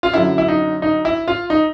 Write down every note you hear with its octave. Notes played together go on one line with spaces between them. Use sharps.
F4
F#2 D3 E4
E4
D#4
D#4
E4
F4
D#4